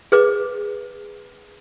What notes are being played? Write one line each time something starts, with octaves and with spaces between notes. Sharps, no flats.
G#4 B4 D6